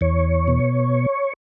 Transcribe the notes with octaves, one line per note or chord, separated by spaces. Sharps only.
E2 C#5
B2